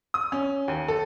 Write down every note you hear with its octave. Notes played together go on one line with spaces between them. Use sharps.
D#6
C#4
D#2
A4